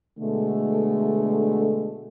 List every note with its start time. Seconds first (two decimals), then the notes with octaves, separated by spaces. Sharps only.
0.19 B2 D3 G#3 A3